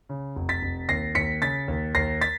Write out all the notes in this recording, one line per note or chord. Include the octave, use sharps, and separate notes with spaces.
C#3
F1
A6 B6
F1
D#2 A#6 C7
D#2 B6 C#7
C#3 A6 B6
D#2
D#2 A#6 C7
A6 B6